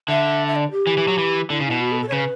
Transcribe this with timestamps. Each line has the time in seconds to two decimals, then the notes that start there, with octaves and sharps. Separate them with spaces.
0.08 D3 E5
0.48 E5
0.56 D5
0.71 G4
0.87 E3
0.98 E3
1.08 F#3
1.18 E3
1.50 D3 E4
1.60 C#3
1.66 B2 E4
1.81 F#4
1.92 A4
2.02 A4
2.08 C#5
2.12 C#3 B4